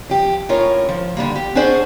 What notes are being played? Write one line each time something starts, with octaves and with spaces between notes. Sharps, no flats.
F3 G4
A2 C#4 F4 A#4 C#5
F3
D3 G3 A#3
G4
C#4 D4 F#4 G#4 C5 D5